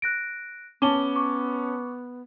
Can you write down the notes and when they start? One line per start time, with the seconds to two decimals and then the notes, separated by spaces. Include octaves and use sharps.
0.02 F#6 A#6 D7
0.82 B3 C#4 A5 D6 G7
1.16 C#6 D6